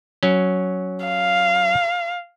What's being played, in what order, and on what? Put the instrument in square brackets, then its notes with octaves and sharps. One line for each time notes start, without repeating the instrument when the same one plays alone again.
[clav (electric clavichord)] F#3 C#4
[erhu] F5